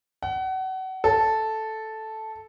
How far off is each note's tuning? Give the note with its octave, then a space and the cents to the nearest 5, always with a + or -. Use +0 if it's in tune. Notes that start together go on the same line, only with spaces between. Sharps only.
F#5 +30
A4 -5